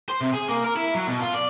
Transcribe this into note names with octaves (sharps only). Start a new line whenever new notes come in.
C5
C3
G#4
A#3
A#4
E4
F#3
B2
F4
D5